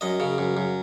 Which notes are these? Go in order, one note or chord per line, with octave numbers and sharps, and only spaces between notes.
F#2 D#5
C#3
F#2
F#2